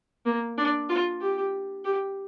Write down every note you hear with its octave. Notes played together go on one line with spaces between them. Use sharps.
A#3
D4
F4
G4
G4